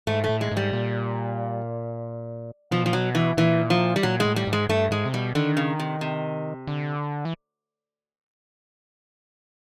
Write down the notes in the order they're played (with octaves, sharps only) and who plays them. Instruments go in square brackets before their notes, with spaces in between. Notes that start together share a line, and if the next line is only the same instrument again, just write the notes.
[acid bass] G#2 [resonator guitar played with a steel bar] A3
[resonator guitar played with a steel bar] A3
[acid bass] A2
[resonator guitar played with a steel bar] G#3
[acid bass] G#2
[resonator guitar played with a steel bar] G3
[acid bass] A#2
[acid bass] B2 [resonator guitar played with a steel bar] F3
[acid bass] A#2 [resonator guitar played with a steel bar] F3
[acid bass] B2 [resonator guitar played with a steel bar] F#3
[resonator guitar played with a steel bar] E3
[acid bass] A#2 [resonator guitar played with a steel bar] E3
[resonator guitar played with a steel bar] F3
G3
[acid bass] A#2 [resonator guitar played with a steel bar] F#3
[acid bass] A2 [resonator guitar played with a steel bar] G#3
[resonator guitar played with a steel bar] G3
[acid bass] G#2
[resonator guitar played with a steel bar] G#3
[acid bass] G2 [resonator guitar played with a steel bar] A3
[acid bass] G#2 [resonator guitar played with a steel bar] G#3
[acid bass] C3
[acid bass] B2 [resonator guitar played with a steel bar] G3
[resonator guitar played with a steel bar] D3 [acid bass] D#3
[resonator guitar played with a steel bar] C#3
C3
C3
[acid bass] D3
E3